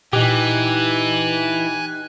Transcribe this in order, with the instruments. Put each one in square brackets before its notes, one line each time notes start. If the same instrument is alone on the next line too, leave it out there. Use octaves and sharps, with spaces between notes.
[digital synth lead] A#2 [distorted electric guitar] E3 [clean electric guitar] D#4 G4 [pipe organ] G#5 F#6 G#6